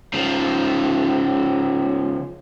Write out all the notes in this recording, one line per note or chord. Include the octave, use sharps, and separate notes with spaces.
C#3 F3